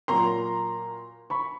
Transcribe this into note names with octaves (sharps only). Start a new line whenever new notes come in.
A#2 F#3 A#3 A#5 C6
B5 C#6